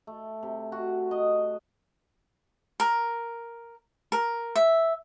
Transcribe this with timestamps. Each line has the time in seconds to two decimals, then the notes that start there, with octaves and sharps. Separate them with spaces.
0.07 A3
0.43 C3
0.72 F#4
1.11 D#5
2.80 A#4
4.12 A#4
4.56 E5